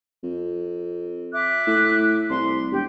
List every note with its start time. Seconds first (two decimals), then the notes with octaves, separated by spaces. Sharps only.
0.24 F2
1.32 E5 D6 F#6
1.67 A2
2.30 C2 C6
2.71 E1 G4